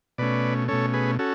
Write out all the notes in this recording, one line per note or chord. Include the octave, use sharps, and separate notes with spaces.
B2 A3 C#4 B4 D5
B2 A3 C#4 A4 C#5
G#4 B4
C#4 F#4 A4